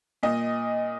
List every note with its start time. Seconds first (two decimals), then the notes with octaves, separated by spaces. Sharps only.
0.23 A#2 D#5